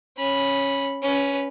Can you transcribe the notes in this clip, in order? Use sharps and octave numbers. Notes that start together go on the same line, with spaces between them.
C#4 B5
C#4 B4